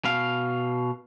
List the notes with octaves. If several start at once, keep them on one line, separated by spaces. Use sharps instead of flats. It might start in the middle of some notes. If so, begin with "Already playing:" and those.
B2 F5